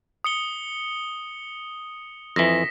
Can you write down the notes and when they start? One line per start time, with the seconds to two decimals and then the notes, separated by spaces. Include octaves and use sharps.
0.24 D#6 C#7 G7
2.36 F2 E3 A#6 B6 E7